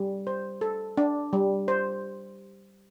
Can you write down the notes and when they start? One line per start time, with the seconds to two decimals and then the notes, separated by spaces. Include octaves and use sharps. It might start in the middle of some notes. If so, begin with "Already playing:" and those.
Already playing: G3
0.27 C5
0.61 A4
0.97 D4
1.33 G3
1.68 C5